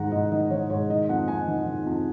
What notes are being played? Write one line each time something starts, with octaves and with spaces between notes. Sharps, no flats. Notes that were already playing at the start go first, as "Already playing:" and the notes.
Already playing: G#2 D#3 F#5 A#5
G#2 D#5
D#3 D#5
D#3 C#5
G#2 C#5
D#3 D#5
F2 F#5
F2 G#5
D#3
D#3
F2